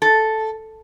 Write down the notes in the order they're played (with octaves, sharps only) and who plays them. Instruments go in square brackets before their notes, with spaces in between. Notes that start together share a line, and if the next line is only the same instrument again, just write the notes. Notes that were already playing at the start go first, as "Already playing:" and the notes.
[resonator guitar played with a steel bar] A4